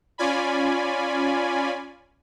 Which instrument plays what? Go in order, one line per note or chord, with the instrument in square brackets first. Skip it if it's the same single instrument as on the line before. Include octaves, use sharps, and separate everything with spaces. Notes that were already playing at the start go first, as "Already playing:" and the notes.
[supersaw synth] C#4 F4 D5 G#5 B5